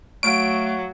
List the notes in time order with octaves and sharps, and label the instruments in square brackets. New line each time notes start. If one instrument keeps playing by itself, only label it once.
[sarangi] F#3 [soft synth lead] A3 [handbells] F5 C#6 [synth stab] D7